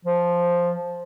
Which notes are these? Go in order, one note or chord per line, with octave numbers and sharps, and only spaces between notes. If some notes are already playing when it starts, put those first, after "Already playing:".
F3